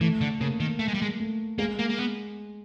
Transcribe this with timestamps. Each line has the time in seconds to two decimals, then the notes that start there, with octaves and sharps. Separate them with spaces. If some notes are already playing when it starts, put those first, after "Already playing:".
0.01 E3 A3
0.21 D3
0.40 C#3 A#3
0.60 D#3
0.79 A3
0.88 G#3
0.94 G3
1.02 G#3
1.20 A3
1.58 G#3 A#3
1.79 A#3
1.89 A#3
1.98 B3